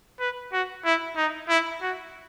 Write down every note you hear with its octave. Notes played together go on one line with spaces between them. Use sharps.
B4
F#4
E4
D#4
E4
F#4